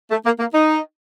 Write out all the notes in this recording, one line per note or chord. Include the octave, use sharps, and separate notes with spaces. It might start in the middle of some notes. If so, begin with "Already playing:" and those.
A3
A#3
A#3
D#4